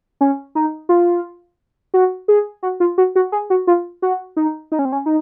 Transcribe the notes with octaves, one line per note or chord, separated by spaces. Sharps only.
C#4
D#4
F4
F#4
G#4
F#4
F4
F#4
F#4
G#4
F#4
F4
F#4
D#4
D#4
C#4
C4
C#4
D#4